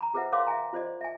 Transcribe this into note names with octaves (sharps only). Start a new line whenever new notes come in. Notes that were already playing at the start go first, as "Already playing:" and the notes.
A#5 B5
F4 G#4 B4 C5 E5 F#5
A#4 C#5 F5 G5 C6 D6
E5 F5 G#5 A#5
F4 C5 D5 D#5
E5 G#5